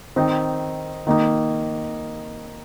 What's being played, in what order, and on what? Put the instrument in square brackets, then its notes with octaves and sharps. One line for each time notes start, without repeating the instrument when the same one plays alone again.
[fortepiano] D#3 C4 D#4
D#3 A#3 D#4